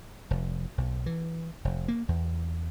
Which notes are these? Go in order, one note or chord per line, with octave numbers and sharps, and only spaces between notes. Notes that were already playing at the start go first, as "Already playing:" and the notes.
F1
B1
E3
F1
A#3
E2